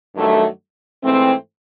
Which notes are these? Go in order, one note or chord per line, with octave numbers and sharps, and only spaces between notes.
G2 D#3 F#3 A3
G#2 E3 A3 C4